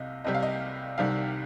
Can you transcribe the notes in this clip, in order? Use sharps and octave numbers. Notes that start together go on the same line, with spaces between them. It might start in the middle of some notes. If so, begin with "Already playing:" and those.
Already playing: C2 C3 D#5 F5
C2 C3 G3 D#5
F5
D#5
C2 C3 D#3 G3 F5